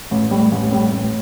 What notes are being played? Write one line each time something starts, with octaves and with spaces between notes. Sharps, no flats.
A1
A2 G3
A1
A2 G3
A1